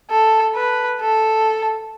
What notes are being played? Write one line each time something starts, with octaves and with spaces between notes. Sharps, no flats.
A4
B4
A4